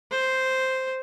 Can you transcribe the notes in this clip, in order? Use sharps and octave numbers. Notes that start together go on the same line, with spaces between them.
C5